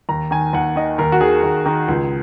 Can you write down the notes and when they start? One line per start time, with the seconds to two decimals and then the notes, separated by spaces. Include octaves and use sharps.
0.09 D#2 A#5
0.31 D#3 G#5
0.53 D#2 F#5
0.76 D#3 D#5
0.98 D#2 A#4
1.12 F#4
1.21 D#3 G#4
1.43 D#2
1.66 D#3
1.88 C#2